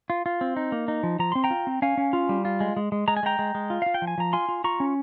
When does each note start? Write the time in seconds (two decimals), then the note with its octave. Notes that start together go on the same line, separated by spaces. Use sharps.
0.10 F4
0.26 F4
0.41 C4
0.56 D#4
0.72 A#3
0.88 D#4
1.03 F3
1.19 F3 A#5
1.32 C4 C6
1.44 G5 A#5
1.50 F4
1.67 C4
1.82 C#4 F5 G#5
1.97 C#4
2.13 F4
2.29 G3
2.45 F4
2.60 G#3
2.77 G#3
2.92 G#3
3.08 G#3 A#5
3.17 G#5
3.23 G#3 G5 A#5
3.39 G#3
3.55 G#3
3.70 F4
3.82 F4 F5
3.94 G5
4.02 F3
4.07 G#5
4.18 F3 A#5
4.33 F4 G#5 C6
4.49 F4
4.64 F4 A#5 C#6
4.80 C#4